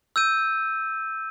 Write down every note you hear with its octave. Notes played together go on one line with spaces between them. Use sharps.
E6 G6 D#7